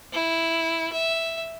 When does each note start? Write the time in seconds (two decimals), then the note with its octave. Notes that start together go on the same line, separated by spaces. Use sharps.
0.13 E4
0.93 E5